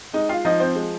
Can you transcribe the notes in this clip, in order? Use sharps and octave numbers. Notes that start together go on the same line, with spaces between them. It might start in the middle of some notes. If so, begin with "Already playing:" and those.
G#3 D#4 D#5
F4 F5
F3 D#4 D#5
C4 C5
G#3